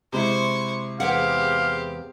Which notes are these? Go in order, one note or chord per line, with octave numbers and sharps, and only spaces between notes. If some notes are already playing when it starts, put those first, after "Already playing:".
C3 G#3 E4 C5 C#6
E2 C4 G4 G#4 F5 F#5